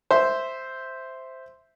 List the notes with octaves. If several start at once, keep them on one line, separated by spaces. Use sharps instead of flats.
C5 E5